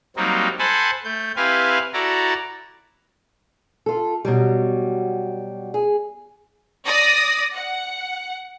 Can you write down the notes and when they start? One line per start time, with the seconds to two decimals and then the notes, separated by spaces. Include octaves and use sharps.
0.16 F#3 G3 A#3 C4 D#4
0.59 A4 C5 F#5 G#5 A5 B5
1.04 A3 G6
1.36 C4 E4 G4 B4 F5 G#5
1.93 E4 F#4 A4 D5 A#5
3.86 F4 A4
4.25 B2 F#3 G3
5.74 G#4
6.86 D5 D#6 A#6
7.54 F#5